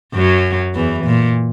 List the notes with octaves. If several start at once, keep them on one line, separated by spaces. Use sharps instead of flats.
F#2 F#3
E2 E3
A#2